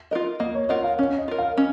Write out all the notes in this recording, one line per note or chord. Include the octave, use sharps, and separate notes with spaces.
F4 A#4 D#5
A#3 D#5
C#5
F4 A#4 D#5 F#5
F5
C#4 C#5
D#5
F4 A#4
F5
C#4 D#5